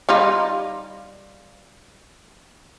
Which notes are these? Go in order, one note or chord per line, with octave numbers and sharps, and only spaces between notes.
G3 D#4 F4